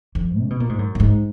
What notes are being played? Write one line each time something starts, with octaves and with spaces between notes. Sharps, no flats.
F2
C#3
B2
A#2
G#2
F#2
A#2
G#2